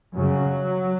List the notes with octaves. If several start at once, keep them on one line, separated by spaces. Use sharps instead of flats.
F#2 C#3 F#3